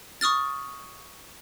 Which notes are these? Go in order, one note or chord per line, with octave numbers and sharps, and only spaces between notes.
C#6 D#6 F6 A6